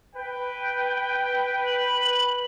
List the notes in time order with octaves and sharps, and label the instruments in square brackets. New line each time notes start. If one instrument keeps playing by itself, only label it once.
[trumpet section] B4 [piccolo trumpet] G5
[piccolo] F#7